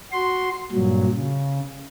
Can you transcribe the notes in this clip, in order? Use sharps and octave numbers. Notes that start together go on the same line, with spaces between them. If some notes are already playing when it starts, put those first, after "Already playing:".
F#4 C6
G2 A#2 F#3
C#3